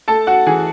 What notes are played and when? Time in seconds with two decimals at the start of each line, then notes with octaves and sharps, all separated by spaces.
0.08 A3 A4 A5
0.27 F#4 F#5
0.46 E3 G#4 G#5